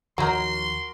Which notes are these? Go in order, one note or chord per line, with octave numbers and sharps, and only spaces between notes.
D#2 D#3 F3 F#3 D#4 F#4 A#4 C6